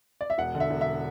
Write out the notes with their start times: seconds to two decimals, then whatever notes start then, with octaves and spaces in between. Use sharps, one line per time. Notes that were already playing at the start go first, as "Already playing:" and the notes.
0.21 D5
0.30 E5
0.38 E1 F#5
0.55 D3
0.60 E5
0.70 E1
0.81 E5